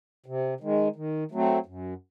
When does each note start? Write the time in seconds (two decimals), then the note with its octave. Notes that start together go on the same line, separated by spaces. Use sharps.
0.26 C3
0.61 D#3 G#3
0.96 D#3
1.31 F#3 A3 C4
1.66 F#2